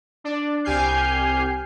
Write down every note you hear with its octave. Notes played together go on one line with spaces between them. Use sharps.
D4 D5
C2 G4 G#5 F6 G6 C7